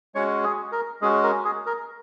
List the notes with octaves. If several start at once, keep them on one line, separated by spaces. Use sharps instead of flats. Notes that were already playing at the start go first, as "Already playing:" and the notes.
G#3 C#4 F#4 C#5
G#4
A#4
G#3 C#4 F#4 G#4
A#4
G#4
A#4